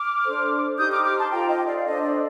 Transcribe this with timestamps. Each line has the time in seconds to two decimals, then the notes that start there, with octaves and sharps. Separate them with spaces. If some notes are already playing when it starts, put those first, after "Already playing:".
Already playing: D6 F6
0.24 D4 A4 C5
0.77 D#4 G4 C5 D#6 G6
0.91 D6 F6
1.04 D6 F6
1.17 A5 C6
1.30 F4 A4 C5 G5 A#5
1.48 D#5 G5
1.66 D5 F5
1.77 F5
1.84 D4 A4 C5 D#5
2.02 D5